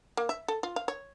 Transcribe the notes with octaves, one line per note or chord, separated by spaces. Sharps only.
A#3
E5
A4
F4
F5
C#5